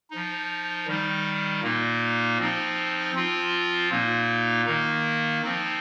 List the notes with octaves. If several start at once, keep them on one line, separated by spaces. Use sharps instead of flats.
F3 D#4
D#3 G3 D#4
A#2 A#3 D#4
F3 C4 D#4
F3 C4 F4
A#2 A#3 D#4
D#3 A#3 D#4
F3 C4 D#4